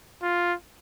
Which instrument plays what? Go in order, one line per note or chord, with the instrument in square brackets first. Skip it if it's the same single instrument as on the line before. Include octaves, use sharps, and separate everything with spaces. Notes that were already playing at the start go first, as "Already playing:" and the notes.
[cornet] F4